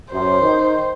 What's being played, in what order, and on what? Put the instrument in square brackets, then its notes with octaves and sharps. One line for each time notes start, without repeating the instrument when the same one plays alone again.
[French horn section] F#2 [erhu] C5
[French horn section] D#3